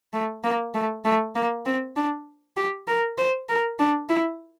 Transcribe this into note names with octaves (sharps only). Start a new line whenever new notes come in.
A3
A#3
A3
A3
A#3
C4
D4
G4
A#4
C5
A#4
D4
E4